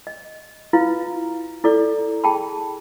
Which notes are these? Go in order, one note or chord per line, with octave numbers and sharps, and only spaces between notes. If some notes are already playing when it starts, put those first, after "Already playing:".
D#5
E4 F4 B4 F5
E4 A4 D5
G#4 G5 A5 B5